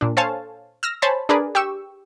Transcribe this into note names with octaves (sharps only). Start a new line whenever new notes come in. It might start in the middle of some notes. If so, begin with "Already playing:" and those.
A#2 D4
A4 C5 C#5 F5 G#5 A5
E6 F6 A#6
C5 C#5 G#5 A5 B5
D4 G#4 A#4 B4 D5
G4 G5 C#6 E6